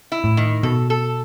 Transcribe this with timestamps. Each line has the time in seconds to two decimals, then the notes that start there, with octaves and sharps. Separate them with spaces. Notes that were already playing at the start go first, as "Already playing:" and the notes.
0.12 E4
0.24 A2
0.37 D#3
0.63 B2 A4
0.90 A4